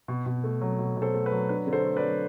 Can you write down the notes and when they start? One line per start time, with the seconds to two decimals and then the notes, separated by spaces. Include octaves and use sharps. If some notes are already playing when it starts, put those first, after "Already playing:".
0.08 B2
0.26 B2
0.44 A3
0.61 F#3
0.79 B2
0.97 B2
1.02 A4 C5
1.14 A3
1.26 B4
1.32 F#3
1.49 D4 B4
1.67 D3
1.73 A4 C5
1.84 A3
1.97 B4 D5
2.02 F#3